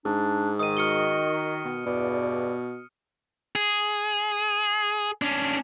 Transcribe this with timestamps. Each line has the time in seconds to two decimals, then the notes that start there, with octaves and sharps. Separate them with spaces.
0.05 G#2 D4
0.59 D#3 D#6 D#7
0.77 F#4 F6 C#7 G7
1.65 B2
1.86 E2 G2 B2 D5
3.56 G#4
5.22 C#4 D4